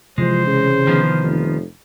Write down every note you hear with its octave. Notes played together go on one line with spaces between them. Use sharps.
C3 E3 F3 G#3 C5
C#3
D#3 F3 B3
F1